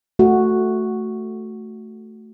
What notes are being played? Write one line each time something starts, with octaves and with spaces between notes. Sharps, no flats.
A3 F#4